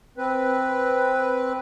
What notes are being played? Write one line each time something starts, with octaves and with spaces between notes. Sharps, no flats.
C4 B4